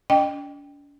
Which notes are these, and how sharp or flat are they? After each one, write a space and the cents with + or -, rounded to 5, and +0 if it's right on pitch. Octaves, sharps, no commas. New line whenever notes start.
D4 -45 D#5 -30 G5 +0